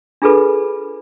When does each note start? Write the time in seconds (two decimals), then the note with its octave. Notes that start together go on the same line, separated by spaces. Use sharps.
0.22 D4 F4 G#4 A4 B4 B5